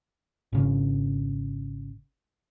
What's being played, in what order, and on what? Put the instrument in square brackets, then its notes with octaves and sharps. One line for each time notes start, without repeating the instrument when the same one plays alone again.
[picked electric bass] G#1 C#3